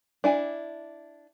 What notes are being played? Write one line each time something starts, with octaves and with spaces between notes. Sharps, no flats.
D4 E4 G#5